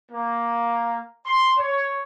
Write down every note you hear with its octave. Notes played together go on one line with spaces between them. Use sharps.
A#3
C6
C#5